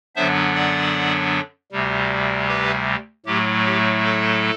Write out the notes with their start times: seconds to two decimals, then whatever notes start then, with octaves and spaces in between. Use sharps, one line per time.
0.16 F#2 D3 F#3 B3 D4 C5 E5
0.55 D5 F#5
1.71 D2 C3 G3
2.48 G4 B4
3.26 A2 F#3 A3 G4
3.65 G4
4.04 A4